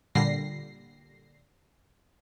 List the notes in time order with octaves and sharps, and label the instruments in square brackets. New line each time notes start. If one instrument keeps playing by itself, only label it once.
[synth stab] A#2 D3 G3 A#6 C7